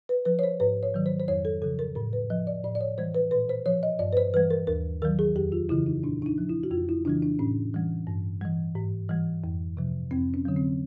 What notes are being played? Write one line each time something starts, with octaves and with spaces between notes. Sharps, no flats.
B4
F3 B4
C#5
C5
G#2 B4
C#5
D#3 F#3
C5
C5
F2 C#5
A4
C#3 F3 A4
A#4
A2 A#4
B4
F3 D#5
D5
A2 D5
D5
C#5
E3 G3 C5
B4
A#2 B4
C5
F3 C#5
D#5
G2 D5
B4
C5
E3 G3 B4
A#4
D#2 A#4
D#3 F#3 A#4
G#4
F2 G4
F4
C#3 E3 E4
D#4
A#2 D4
D4
D#4
F3
E4
F#4
F2 F4
E4
C#3 E3 G3 D4
D4
A2 C#4
E3 G3
G2
E3 G3
G#2
E3 G3
F2
C3 F3
F2 C4
C#4
D3 F#3
C4